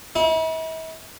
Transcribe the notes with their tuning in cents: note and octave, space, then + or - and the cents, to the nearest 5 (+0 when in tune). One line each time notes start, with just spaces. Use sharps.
E4 -45